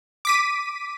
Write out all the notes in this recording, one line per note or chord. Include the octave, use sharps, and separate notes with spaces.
D6 B6 D#7